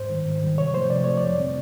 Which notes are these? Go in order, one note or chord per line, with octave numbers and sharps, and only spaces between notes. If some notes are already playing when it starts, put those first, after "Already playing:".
Already playing: G#2 C5
D#3 G3
G#2
D#3 G3
C3 C#5
F3 A3 C5
C3 D5
F3 A3 C#5
F2 D5
D3 G3 C4